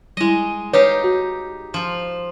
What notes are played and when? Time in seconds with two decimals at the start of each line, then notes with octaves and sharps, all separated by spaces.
0.17 G3 G#3 E4 D#5
0.73 D#4 G4 B4 C#5 F5
1.04 F#4
1.74 F3 F4